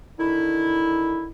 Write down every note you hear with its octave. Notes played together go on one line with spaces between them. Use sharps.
D3 D#3 E4